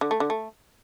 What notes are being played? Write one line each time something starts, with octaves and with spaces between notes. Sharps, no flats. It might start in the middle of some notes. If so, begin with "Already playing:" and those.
D3
A3
D3
A3